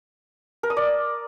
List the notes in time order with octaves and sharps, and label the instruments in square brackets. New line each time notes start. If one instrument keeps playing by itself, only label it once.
[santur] A#4
D#6
D5